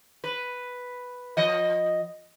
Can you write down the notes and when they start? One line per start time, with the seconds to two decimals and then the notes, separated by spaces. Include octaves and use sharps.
0.24 B4
1.37 F3 D#5